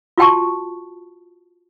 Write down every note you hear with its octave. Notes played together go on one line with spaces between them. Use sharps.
F4 F#4 G5 A5 C#6